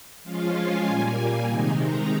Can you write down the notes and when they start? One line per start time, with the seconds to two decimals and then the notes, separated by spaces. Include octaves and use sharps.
0.23 F3 G#3 C#4 F4 F5
0.54 G#5
0.86 A#2 G3 A#3
1.47 C3 D#3 G#3 D#4
1.78 A#5